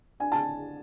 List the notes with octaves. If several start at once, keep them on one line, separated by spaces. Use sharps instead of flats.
D4 G#5
A5